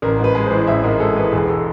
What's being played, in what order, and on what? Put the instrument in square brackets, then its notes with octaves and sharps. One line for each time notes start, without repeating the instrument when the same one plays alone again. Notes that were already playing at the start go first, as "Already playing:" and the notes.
[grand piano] A1 [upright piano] A#4
[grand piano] G#2
[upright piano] B4
[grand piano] G#3
[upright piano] C5
[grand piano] E3
[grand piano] A1 [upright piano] E5
[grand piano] G#2 [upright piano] A#4
[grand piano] G#3 [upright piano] A4
[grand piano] E3 [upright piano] B4
[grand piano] E1 [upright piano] G#4
[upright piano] A4